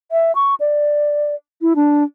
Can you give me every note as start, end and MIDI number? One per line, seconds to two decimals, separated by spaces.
0.12 0.35 76
0.35 0.55 85
0.60 1.35 74
1.62 1.73 64
1.76 2.03 62